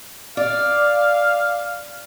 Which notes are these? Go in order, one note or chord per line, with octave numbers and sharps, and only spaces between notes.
D5 F5